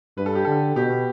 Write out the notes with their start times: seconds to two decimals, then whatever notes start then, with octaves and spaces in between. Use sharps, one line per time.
0.17 G2 B4
0.26 A4
0.35 G4
0.45 D3 A4
0.76 B2 G4